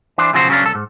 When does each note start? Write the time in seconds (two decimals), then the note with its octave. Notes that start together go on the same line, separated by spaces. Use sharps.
0.18 E3 D4 C5
0.33 B1 C#3 F3 F#3 F#4 C5
0.49 C#3 F#3 G3 C#4 D4
0.63 C2 A4
0.75 G#2